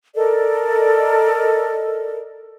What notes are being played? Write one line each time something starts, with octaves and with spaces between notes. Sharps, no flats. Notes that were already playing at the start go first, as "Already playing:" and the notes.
A4 A#4 D5 D#5